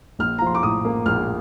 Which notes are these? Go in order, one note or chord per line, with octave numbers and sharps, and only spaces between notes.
A#1 F6
A#5
F3 C6
D6
A2 D#6
A#3
A#1 F6